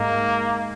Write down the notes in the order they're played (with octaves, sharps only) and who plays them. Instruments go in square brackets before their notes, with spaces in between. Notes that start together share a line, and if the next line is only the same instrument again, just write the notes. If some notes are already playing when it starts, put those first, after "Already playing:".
Already playing: [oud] G#2 [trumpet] A#3